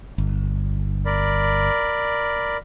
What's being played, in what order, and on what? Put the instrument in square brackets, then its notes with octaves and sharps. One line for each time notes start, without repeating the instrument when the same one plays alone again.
[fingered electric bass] G1
[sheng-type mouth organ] A#4 D5 B5